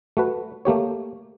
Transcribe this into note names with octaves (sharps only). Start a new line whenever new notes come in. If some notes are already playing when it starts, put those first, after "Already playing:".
A3 F#4 B4
A3 A#3 G4 C#5